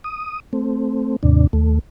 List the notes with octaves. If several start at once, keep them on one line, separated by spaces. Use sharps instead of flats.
D#6
A3 C4
D#2 G#2 C3 D4
D#2 A3